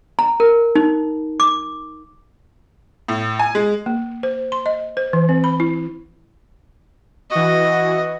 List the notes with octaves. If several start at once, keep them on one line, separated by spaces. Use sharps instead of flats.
A#5
A#4
D#4
D6
A2
G#5
G#3
A#3
C5
C6
D#5
C5
E3
C4
B5
E4
E3 F#4 D#5